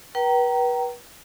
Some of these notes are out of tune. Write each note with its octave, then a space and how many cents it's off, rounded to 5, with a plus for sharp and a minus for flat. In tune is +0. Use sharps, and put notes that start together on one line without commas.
B4 -35 G5 -30 A#5 +0